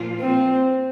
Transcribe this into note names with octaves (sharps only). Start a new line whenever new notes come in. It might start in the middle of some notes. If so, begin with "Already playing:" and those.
Already playing: A#2 F3 A#3 F4
C4